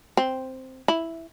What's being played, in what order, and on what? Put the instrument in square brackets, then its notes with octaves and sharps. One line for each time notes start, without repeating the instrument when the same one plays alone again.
[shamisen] C4
E4